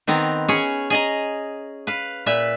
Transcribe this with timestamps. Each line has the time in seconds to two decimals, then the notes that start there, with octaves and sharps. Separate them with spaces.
0.07 D#3 B3 C4 A#5
0.48 C#4 G#4 C#5
0.90 G#4 D#5 A#5
1.87 B4 F5
2.26 A#2 B4 E5